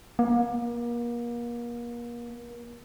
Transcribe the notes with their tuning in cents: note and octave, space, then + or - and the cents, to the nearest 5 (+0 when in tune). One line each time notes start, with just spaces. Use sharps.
A#3 +35